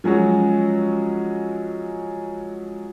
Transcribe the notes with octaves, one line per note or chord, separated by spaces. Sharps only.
F3 F#3 G#3 C#4 F#4